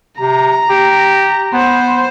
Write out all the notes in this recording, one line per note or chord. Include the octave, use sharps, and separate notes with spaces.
C3 A#5
G4
B3 C5